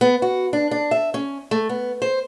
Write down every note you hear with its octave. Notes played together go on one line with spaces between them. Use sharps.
B3
F#4
D4
D4
E5
C#4
A3
B3
C5